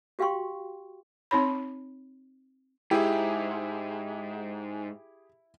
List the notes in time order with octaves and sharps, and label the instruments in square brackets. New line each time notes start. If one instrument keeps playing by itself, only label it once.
[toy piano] F#4 G4 F5 G5 C6 C#6
[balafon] C4 D#4 C#5 B5
[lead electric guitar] G#2 [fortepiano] E4 [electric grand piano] G4 G#4 [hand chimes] E5 G5